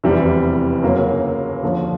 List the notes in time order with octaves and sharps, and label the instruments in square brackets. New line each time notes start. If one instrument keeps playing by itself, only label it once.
[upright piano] F1 E2 C3 E3 G3
G1 F#2 C#3 F#3 A#3
D#2 D3 F3